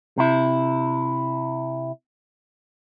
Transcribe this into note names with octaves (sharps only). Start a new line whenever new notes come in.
C3 E4